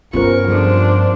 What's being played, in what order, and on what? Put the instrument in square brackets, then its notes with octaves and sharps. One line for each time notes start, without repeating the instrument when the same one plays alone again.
[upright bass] G2 [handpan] B3 C#4 A#4 [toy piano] F4 G4 C5 [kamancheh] C#6
[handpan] F3 G3 [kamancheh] D4 C5 [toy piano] G#4 A4